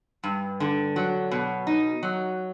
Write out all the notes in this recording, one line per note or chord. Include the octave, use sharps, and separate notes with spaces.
G2
D3
F#3
B2
D#4
F#3